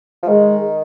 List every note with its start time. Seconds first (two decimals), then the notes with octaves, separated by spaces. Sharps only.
0.23 F3
0.28 D#3 G#3